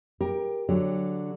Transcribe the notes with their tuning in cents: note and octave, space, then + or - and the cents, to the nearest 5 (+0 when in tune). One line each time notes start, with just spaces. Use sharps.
G4 +15 A#4 +20
D3 +0 F#3 +0 G4 +25